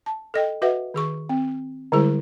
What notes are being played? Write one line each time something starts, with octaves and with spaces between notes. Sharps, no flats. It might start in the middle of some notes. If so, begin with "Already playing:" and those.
A5
A4 D#5 G5
F#4 B4 D#5 E5 F#5
D#3 G#4 C#6
C4
D3 G3 G#3 E4 G#4 C5